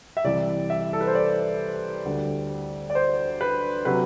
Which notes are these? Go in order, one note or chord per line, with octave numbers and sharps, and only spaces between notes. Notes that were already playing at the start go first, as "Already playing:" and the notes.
E5
C2 C3 E3 D5
E5
A4
B4
C5
D5
D2 D3 G3
D5
C5
B4
C3 F#3 B4